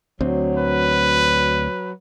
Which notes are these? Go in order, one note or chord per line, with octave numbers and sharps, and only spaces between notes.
D2 F#3 C4
B4